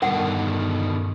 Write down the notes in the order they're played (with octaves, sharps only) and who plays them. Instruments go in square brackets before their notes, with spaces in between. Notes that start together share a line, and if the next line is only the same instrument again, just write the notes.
[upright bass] E2 G2 [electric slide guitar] B2 D3 D#3 [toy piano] A#4 F#5